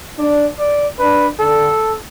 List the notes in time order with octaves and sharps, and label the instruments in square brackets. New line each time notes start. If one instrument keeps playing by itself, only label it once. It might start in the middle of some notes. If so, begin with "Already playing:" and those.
[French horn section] D4 [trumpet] D5
[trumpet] D5
[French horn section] D4 [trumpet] B4
[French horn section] D3 [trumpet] A4